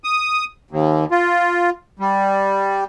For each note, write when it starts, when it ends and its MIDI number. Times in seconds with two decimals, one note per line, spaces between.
0.04 0.45 87
0.71 1.05 39
1.11 1.70 65
2.00 2.84 55